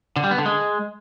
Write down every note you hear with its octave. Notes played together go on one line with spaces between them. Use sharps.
D3
G3
B3
D3
G#3